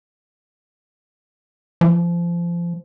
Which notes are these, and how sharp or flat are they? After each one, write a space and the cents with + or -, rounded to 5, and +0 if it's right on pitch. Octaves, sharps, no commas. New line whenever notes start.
F3 -25